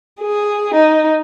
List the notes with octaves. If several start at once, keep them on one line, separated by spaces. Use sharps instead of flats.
G#4
D#4